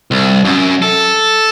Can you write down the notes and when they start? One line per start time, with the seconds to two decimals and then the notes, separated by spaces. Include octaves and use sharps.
0.11 C2
0.45 F#2
0.82 A4